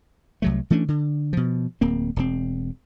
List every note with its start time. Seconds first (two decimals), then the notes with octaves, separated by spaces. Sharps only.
0.42 C2 F#3 A3
0.70 E3 A3 C#4 D4
0.88 D3
1.33 B2 F3
1.81 D1 A#3 C4
2.16 E1 A#2 C4